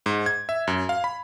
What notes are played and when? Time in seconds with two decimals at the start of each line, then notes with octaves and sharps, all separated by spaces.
0.06 G#2
0.26 G#6
0.49 E5
0.67 F#2
0.89 F5
1.04 B5